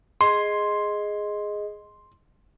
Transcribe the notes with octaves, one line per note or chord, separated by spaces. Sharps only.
G#4 D#5 C6